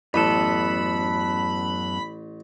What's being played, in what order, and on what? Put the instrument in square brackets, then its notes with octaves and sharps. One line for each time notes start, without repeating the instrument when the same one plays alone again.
[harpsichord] A1 [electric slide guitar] F#2 B3 A4 [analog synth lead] B5